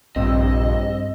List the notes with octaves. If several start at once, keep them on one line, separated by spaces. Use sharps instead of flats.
A#1 G2 C4 D#5 E6